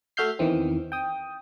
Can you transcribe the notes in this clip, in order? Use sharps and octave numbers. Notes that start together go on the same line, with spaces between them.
A3 F#4 E5 F6 G6 C7
E2 D#3 E3 C4
G5 D#6